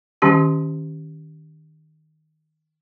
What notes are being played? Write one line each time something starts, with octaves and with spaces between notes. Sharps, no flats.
D#3 G3 C#4 G4 A5